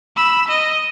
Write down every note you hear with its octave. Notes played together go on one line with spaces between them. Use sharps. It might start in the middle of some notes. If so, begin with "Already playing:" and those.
B5 E6
D#5